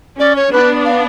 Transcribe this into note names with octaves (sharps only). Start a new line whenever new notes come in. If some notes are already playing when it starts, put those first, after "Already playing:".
C#4 D5
C#5
B3 D4 B4
F5